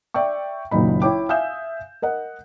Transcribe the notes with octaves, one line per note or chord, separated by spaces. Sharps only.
D5 E5 G5 C#6
F#1 A#2 D#3 F#3 D#4 B5
E4 C#5 G5 D6
E5 F5 G#5 D#6 G6 E7
A#4 D#5 F#5